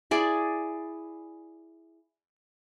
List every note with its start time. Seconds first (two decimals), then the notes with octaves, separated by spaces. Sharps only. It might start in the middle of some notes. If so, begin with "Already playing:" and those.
0.11 E4 G#4 D5